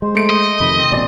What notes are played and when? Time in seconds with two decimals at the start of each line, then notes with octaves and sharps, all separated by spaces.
0.02 G#3 C5
0.15 A3 C#7 D7
0.30 D#5
0.60 F2 C3 D#3 B5
0.78 C4
0.92 A1 B2 D5